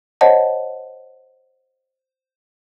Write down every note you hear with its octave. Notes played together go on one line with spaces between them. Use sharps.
C5 C#5 D#5 F#5 A5